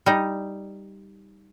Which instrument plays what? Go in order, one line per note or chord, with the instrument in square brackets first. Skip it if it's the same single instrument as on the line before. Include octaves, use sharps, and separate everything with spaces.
[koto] G3 D#4